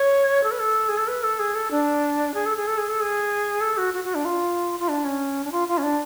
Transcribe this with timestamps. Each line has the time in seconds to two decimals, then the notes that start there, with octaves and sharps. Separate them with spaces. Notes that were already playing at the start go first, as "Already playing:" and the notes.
Already playing: C#5
0.44 A4
0.51 B4
0.59 A4
0.89 G#4
0.98 A4
1.08 B4
1.23 A4
1.39 G#4
1.55 A4
1.71 D4
2.34 G#4
2.46 A4
2.56 G#4
2.67 A4
2.78 G#4
2.90 A4
3.01 G#4
3.61 A4
3.77 F#4
3.94 F#4
4.04 F#4
4.15 D4
4.25 F4
4.80 F4
4.89 D4
5.05 C#4
5.44 D4
5.52 F4
5.68 F4
5.78 C#4
5.83 D4